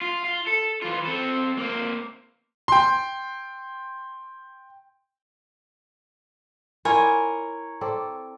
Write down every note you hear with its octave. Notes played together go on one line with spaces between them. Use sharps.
F4
F4
A4
E3 F4
C4 A4
A#3 C4
G5 C6
E4 F4 A#4 C#5 D5 G#5
C4 A4 D5